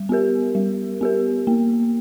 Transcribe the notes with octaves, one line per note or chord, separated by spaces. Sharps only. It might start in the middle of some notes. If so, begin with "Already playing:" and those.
Already playing: G3
B3 G4 A#4
G3
B3 G4 A#4
A#3